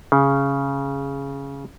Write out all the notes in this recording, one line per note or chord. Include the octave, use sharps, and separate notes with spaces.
C#3